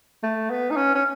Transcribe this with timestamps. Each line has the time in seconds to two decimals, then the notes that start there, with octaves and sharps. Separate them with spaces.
0.23 A3
0.50 B3
0.71 D#4
0.77 C#4
0.95 C#4